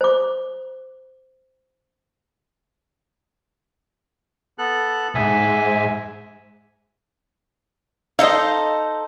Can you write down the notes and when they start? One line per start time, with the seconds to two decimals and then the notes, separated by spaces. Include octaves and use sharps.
0.01 C5 D6
4.58 B3 A4 F#6
5.15 C2 G#2 E5 G#5
8.19 D#4 A4 C5 D#5 F5